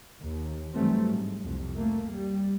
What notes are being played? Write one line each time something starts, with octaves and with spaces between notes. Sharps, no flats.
D#2
G2 E3 F#3 G3 A3 C4
G#2
C2 F2
A3 A#3
G3